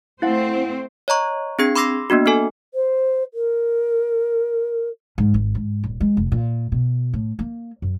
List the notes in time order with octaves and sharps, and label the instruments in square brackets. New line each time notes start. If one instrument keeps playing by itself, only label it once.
[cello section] A3 C4 C5 [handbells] E4 F5 F#5
[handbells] C#5 D#5 A#5 C#6
C4 D4 G#4 G#6 C7
B5 C6 D6 E6 A#6 C7
A#3 B3 D4 F#4
B3 F#4 A4 G#5
[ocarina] C5
A#4
[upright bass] G#2
G#1
G#2
D#1
G#3
F1
A#2
B2
A2
A#3
F#2